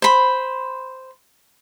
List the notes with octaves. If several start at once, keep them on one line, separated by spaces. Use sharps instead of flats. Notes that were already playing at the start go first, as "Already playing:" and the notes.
C5 B5